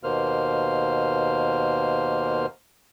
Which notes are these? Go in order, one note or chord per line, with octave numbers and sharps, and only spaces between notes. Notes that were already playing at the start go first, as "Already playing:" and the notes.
D#2 B2 A#3 C5 F6